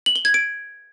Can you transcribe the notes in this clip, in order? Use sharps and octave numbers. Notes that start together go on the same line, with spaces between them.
F#7
G7
G#6
D7